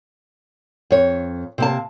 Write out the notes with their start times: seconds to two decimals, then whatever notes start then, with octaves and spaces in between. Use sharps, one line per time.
0.91 F2 C#5
1.58 C3 A#3 A5